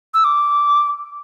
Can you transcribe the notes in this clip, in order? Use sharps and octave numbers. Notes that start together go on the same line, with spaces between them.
E6
D6